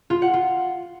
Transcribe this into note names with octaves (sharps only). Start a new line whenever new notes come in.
F4
F#5
F4